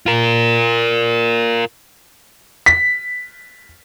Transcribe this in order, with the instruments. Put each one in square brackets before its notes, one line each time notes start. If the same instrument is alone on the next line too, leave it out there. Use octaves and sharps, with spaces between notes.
[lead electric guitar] F4 A#4
[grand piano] B6